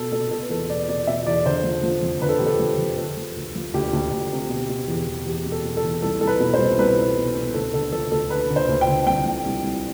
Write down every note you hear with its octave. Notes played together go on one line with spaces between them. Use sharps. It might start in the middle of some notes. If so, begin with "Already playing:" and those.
Already playing: B2 A4
B2 A4
B2 A4
B4
E2 A4
B2 D5
B2 D5
B2 E5
E2 D5
D3 C5
F3
F3
F2
D3 B4
A4
F2 G4
A4
F3
F2
C3 A4
F3
D2
F3
D2 G4
D2
D2
C3
B2
B2
E2
E2
E2 G4
B2
A4
B2
A4
E2
C2 A4
C2 A4
B4
B2
C5
C2
C2 B4
B2
B2
B2
D2 A4
D3 A4
F3 A4
D2 A4
D3 B4
D3
C5
D2
G5
D3
C2 G5
F3
C2
C2